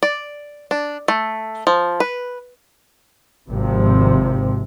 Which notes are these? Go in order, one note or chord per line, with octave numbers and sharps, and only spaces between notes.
D5
D4
A3
F3
B4
G#1 C3 F3